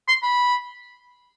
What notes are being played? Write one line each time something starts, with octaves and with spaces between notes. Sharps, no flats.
C6
B5